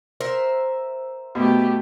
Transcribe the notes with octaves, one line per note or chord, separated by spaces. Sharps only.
A#4 C5 E5
B2 A3 G4